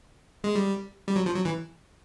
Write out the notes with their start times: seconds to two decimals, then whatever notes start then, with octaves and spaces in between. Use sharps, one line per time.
0.44 G#3
0.55 G3
1.08 G3
1.16 F#3
1.26 F3
1.35 F#3
1.45 E3